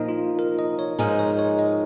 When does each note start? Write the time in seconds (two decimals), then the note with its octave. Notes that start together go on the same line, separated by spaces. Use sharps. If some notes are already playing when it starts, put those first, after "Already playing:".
Already playing: A#2 F3 A#3 D#4 D#5
0.09 F4
0.39 A#4
0.59 D#5
0.79 C#5
0.99 G#2 F3 G#3 D#4 G#4 A#4
1.19 C#5
1.39 C#5
1.59 D#5